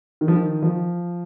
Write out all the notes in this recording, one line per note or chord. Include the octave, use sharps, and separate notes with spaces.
D#3
F3
D#3
F3